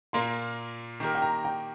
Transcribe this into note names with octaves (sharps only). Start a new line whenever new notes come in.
A#2 A#3 F4 A#4 C6
D#3 A#3 G4 A#4
G5
A#5
G5